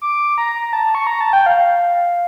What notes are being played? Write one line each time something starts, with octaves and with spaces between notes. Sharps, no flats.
D6
A#5
A5
C#6
A#5
A5
G5
F5